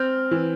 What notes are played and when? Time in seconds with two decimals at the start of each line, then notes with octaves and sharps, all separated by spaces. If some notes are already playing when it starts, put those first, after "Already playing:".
Already playing: C4 F6 G6
0.31 E3